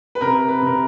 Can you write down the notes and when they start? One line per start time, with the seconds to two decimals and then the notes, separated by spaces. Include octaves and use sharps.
0.15 B4
0.21 C3 A#4
0.48 B4
0.62 C3 A#4